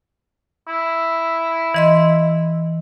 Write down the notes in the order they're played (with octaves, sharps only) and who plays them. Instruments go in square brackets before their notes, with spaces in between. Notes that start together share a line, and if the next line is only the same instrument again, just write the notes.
[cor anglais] E4
[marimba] E3 D#5 C6